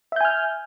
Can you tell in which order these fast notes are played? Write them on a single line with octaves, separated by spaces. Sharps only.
E5 G6 G#5 F6